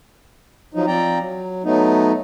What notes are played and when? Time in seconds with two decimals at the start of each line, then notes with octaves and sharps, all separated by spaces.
0.74 F3 F#3 D#4
0.87 F3 C4 D5 G5 A#5
1.18 F#3
1.64 F#3 A3 B3 D#4